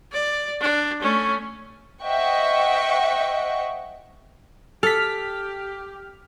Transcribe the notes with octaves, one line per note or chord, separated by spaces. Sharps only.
D5
D4
A3 C#4
C5 D#5 E5 F#5 G5 C#6
G4 A4 F6 B6